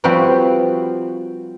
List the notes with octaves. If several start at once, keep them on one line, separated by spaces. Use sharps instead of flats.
F3 G3 C4 F#4 B4 C5